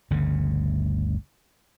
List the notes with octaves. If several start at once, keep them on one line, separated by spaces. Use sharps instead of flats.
G1 D2 C#3